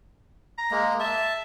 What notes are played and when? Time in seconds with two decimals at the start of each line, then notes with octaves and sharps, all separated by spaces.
0.58 A#5
0.71 G#3 A#3
1.00 E5 A5